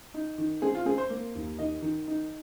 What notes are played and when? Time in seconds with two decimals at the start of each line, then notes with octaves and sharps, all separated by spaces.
0.14 D#4
0.38 D#3
0.62 C4 G#4
0.75 F4
0.86 C4 G#4
0.98 C5
1.10 A#3
1.35 D#2
1.59 D#3 D#5
1.82 D#3
2.08 D#4